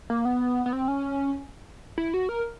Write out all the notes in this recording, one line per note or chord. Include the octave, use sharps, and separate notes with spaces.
A#3
B3
B3
C4
C#4
E4
F#4
A#4